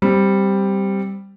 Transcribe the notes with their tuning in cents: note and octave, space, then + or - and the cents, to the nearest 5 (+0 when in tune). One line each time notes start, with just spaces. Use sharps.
G3 +0 C4 +0